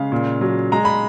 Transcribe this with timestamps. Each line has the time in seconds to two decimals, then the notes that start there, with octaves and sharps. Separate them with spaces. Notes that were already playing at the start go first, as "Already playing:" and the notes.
Already playing: C#3 G#3 F5
0.12 A#2
0.41 F#3
0.72 G#3 A#5
0.85 B5